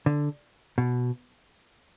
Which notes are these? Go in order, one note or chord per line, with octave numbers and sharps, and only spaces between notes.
D3
B2